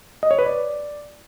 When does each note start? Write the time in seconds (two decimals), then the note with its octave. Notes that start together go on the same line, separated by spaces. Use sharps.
0.23 D#5
0.31 C#5
0.38 B4
0.46 D5